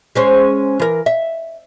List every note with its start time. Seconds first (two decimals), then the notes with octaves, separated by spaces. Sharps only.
0.15 G#3 C#4 C5
0.80 E3 A#4
1.06 E5